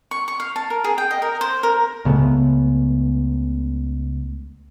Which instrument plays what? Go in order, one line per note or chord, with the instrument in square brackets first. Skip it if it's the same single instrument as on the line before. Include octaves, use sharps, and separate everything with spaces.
[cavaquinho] C#6
C#6
F5
A5
A#4
G#4
G5
D#5
A#4
C5
A#4
[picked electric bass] C#2 C#3 A3 B3